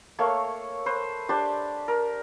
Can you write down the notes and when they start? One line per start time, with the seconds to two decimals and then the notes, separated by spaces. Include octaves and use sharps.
0.19 A3 A#3 C#5
0.86 B4 C5
1.29 D4 G4 B4 C5
1.88 A#4